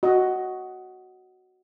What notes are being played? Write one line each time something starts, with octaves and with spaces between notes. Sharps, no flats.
F#4 D#5